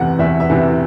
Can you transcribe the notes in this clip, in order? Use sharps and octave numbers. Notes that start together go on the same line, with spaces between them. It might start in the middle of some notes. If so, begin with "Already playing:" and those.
Already playing: E2 C3 E3 F#5
E2 E5
E5
C3 E3